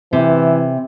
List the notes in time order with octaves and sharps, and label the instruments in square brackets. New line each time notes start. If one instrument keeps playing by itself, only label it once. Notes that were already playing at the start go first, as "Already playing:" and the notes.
[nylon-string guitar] C3 [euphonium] E3